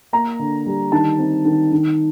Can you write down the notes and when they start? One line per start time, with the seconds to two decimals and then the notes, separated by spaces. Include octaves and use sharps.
0.13 A#3 A#5
0.39 D3
0.66 G3
0.92 D#3 A5
1.19 C4
1.45 D#3
1.72 D#3